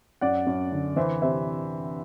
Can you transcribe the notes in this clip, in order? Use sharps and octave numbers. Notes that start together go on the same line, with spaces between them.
F#2 D5 F#5
F#2
D3
E3 C5 E5
C3 C5 E5